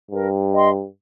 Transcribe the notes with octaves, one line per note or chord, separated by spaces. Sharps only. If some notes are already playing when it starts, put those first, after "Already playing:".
G2 A#4
D#5 G5 C6